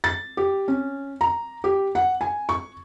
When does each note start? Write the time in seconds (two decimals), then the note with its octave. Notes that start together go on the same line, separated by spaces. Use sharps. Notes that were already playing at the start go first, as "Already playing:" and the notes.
0.04 A6
0.37 G4
0.68 C#4
1.21 A#5
1.64 G4
1.95 F#5
2.21 G#5
2.49 C#6